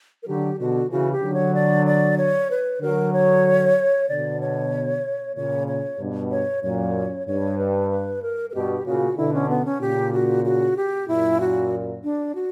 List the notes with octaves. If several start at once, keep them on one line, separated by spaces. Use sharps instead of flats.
A#4
D3 F#3 G4
B2 D3 F#4
C#3 E3 F#4
G4
D3 F#3
C#5
D5
D5
C#5
B4
D3 F#3 A#4
C#5
B2 D3 D5
C#5
A#2 C#3 C#5
C#5
G2 B2
C#5
F#2 A#2 C#5
G2 C#5
B4
B4
A#4
A#4
G2 B2 G4
A#2 C#3 F#4
B2 D3 E4
C#4
B3
C#4
A#2 C#3 G4
F#4
F#4
G4
F#2 A#2 E4
F#4
D4
F#4